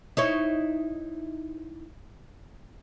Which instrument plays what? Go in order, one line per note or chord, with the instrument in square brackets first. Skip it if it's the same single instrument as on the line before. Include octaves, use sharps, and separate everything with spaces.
[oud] D#4 E4 C#5